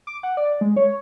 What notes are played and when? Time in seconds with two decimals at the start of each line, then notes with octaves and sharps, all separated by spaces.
0.07 D6
0.23 F#5
0.37 D5
0.61 G#3
0.76 C#5